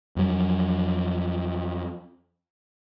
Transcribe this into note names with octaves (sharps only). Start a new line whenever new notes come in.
F2 F#3